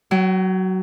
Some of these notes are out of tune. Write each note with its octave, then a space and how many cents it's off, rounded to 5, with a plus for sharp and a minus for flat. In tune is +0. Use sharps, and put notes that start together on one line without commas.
F#3 +15 G5 -40